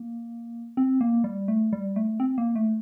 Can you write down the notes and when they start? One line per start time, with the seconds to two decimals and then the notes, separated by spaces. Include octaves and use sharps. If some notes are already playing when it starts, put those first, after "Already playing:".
Already playing: A#3
0.77 C4
1.01 A#3
1.24 G3
1.48 A3
1.73 G3
1.96 A3
2.20 C4
2.38 A#3
2.56 A3